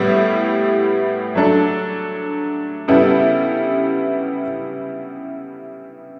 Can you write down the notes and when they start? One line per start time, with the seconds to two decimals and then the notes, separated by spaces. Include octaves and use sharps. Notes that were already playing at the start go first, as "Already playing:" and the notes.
Already playing: A2 G3 B3 E4
1.35 F#3 A3 D4 A4
2.88 C#3 G3 B3 E4 A4